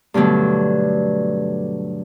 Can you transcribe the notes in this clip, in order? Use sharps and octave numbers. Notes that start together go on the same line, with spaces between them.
G2 B2 D3 F#3 A3